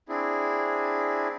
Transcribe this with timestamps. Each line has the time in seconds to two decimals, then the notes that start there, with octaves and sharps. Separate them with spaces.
0.09 C4 D4 E4 G#4